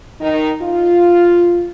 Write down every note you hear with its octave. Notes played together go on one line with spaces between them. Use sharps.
D#3 D#4
F4